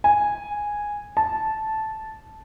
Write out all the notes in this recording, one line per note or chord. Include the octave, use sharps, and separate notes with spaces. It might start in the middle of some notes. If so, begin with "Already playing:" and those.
G#5
A5